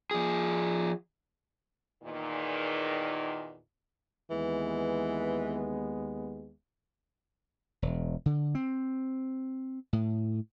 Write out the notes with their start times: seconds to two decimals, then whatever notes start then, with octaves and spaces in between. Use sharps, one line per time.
0.11 F3 G#4
2.03 E2 A#2 D#3
4.31 D#2 E3 G#3 B3
7.82 E1
8.26 D3
8.55 C4
9.93 A2